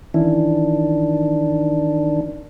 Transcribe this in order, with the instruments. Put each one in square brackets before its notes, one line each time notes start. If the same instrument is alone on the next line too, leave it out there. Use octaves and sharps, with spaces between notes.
[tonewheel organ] D#3 D4 [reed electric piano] E3 C#4 E4